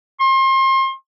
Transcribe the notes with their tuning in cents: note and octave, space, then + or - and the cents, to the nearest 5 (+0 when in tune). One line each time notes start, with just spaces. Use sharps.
C6 +35